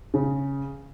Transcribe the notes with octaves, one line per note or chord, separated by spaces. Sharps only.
C#3